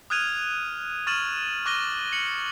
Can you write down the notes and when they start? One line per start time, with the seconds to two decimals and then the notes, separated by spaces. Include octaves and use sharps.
0.10 D#6 F6 F#6 G#6 D#7 F7
1.07 C#6 F6 A6 D#7 E7 F#7
1.66 C#6 D6 F#6 A#6 D#7 G7
2.12 C#7 F#7